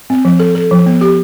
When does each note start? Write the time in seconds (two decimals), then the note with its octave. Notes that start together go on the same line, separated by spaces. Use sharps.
0.10 C4
0.25 F3
0.40 A4
0.55 A4
0.71 F3
0.86 B3
1.01 G4